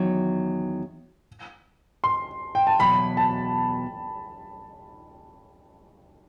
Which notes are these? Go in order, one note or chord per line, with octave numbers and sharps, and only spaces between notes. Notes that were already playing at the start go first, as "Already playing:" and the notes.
Already playing: E2 D#3 F#3
C6
G5
A5
E2 B2 F#3 B5
A5